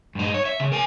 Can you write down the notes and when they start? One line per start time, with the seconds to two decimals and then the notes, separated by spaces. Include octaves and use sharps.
0.15 G2 D#4
0.34 C#5
0.45 E5
0.60 C#3
0.72 A#4 G#5